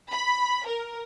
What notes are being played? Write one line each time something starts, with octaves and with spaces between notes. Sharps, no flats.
B5
A#4